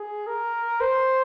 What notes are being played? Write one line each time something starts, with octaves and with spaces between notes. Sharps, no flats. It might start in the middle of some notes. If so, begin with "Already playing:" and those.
Already playing: G#4
A#4
C5